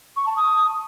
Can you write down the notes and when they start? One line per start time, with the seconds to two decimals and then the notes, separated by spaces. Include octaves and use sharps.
0.16 C#6
0.26 A5
0.36 D#6